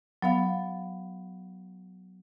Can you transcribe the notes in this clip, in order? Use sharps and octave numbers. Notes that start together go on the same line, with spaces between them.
F#3 B3 F5